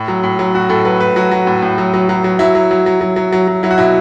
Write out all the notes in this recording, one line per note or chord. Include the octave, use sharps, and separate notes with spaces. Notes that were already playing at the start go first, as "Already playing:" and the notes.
Already playing: A2
F#3
A2
F#3
A2 F#4
A2 A4
F#3 B4
A2 B4
F#3 F#4
F#3
A2
A2
F#3
F#3
F#3
F#3
F#3 E4
F#3
F#3
F#3
F#3
F#3
F#3
F#3
F#3 E4
F#4
B2 E4